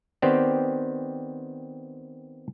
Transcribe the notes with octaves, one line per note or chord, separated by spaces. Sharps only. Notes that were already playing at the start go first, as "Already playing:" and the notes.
D#3 B3 C4 G4 C5 D5